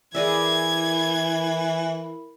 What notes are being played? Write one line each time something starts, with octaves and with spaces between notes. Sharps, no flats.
E3 E4 G#4 A#4 D5 E5 B5 G#6